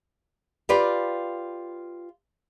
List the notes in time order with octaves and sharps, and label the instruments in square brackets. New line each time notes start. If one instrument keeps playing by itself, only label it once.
[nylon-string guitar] F4 G4 B4 D5 F5